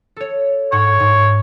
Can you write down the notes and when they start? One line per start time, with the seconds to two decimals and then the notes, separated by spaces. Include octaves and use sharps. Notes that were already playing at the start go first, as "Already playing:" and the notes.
0.16 A4 C#5
0.72 G#2 C#5 F#5
1.00 G#2